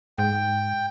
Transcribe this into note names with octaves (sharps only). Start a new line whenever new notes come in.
G#2 G5